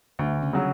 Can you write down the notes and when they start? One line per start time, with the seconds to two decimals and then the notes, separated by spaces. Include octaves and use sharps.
0.19 D2 D3 D4
0.42 C#3 C#4
0.53 C#3 F#3